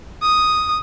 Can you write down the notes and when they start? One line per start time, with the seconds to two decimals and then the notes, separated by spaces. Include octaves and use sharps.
0.22 D#6